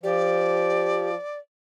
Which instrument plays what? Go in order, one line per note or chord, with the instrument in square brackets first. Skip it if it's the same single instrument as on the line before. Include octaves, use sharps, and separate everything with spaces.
[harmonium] F3 [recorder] G4 [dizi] D5